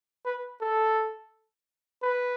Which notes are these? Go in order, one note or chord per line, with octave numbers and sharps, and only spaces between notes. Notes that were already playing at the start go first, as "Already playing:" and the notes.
B4
A4
B4